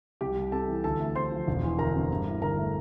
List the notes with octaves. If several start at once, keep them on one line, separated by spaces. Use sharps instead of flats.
C2 G4 G5
C2
C3 A4 A5
E3
D2 A4 A5
A3
C3 C5 C6
F3
E1
E3
D2 A#4 A#5
C3
G2
E4
D3 A#4 A#5
A3